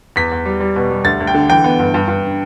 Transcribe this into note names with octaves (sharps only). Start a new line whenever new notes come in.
E2 B6
E2
G3
G3
B2
G3
D2 A6
D2
G5
D3
E3 G5
B3
G2
G2
G2